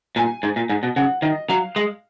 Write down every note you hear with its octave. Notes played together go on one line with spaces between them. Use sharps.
A#2 G#5
G#2
A#2
G#2
B2
C#3 F#5
D#3 D#5
F#3 F5
G#3